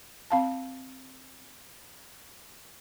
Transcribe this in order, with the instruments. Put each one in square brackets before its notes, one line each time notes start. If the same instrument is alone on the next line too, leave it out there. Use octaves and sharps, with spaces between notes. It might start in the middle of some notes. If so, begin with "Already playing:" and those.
[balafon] C4 F5 A5